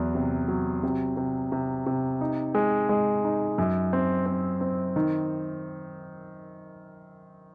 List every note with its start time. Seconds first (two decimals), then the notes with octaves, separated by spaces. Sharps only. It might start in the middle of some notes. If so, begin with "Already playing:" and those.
Already playing: E2 F#3
0.15 C3
0.48 F#3
0.83 C3
1.17 C3
1.52 C3
1.86 C3
2.21 D#4
2.55 G#3
2.89 G#3
3.24 D#4
3.58 F#2
3.93 C4
4.26 C4
4.61 C4
4.96 D#3